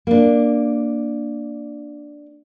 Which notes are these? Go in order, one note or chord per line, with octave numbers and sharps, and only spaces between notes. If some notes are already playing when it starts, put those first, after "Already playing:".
A#3 D4